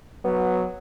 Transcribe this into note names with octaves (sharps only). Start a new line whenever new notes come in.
F#3 B3